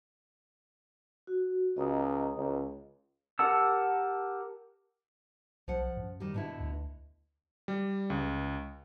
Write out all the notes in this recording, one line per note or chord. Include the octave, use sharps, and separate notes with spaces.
F#4
C#2 D#5 A#5 D#6
C#2
G4 A#4 F#5 A5 E6
B1 F3 F#5
F#2
D#3 G3
G2 B2 D3 E4
D2
G3
C#2